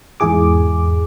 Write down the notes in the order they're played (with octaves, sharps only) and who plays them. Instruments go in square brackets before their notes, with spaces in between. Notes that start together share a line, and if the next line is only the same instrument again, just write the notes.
[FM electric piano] E2 G#2 E4 G#4 D6